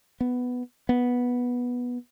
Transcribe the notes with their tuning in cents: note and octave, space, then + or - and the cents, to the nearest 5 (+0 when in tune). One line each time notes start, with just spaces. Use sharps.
B3 +5
B3 -10